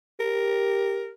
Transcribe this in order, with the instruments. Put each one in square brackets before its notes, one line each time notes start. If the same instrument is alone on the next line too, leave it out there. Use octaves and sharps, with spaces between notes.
[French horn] G4 [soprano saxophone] A#4